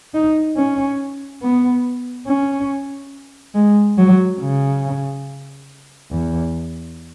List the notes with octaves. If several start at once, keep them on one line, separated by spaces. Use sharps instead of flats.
D#4
C#4
B3
C#4
G#3
F#3
C#3
E2